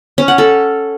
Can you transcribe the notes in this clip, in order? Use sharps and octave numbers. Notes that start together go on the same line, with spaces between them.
C#4
F#5
A4